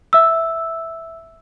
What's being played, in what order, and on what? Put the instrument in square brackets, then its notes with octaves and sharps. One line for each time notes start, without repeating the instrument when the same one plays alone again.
[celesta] E5 E6